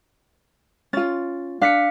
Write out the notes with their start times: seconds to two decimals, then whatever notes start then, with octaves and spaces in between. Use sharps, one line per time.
0.93 C#4 F4 A6
1.61 D4 F5 B6 C#7